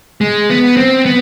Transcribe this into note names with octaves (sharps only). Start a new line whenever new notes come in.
G#3
B3
C4
B3